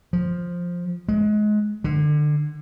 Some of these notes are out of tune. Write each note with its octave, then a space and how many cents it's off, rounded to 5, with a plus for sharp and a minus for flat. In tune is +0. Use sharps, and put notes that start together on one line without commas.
F3 +5
G#3 +25
D3 +25